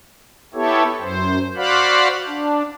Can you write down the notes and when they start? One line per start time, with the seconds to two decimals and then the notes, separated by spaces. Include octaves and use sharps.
0.54 B3 E4 G4 A4 C#5
1.01 F#2 C5
1.56 F#4 C5 D5 F5 F#5 B5
2.27 D4